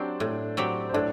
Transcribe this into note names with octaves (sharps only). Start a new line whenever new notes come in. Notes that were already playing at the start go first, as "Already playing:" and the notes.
Already playing: F#3 C4 D4 G4 C5 D5
A2
F#3 C4 G4
C5
A2 D4 D5